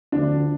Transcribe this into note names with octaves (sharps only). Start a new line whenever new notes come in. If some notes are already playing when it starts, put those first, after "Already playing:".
D2 D3 F3 D4